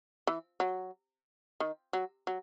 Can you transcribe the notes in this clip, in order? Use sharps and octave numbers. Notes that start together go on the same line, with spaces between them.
E3
F#3
D#3
F#3
F#3